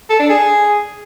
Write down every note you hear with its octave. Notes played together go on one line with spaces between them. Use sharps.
A4
D4
G#4